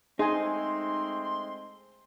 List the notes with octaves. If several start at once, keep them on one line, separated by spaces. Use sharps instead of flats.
G#3 A3 C4 D#4 G#4 G#5 C6